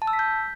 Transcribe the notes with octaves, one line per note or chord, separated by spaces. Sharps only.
A5
E6
B6
G6